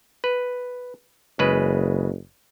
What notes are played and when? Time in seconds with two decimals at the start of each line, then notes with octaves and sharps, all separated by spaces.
0.24 B4
1.39 F#1 C#3 G#3 B4